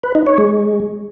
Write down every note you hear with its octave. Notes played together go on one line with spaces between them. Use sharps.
B4
D#4
C#5
G#3